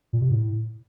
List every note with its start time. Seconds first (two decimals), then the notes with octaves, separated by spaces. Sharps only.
0.13 A#2
0.21 C3
0.30 A2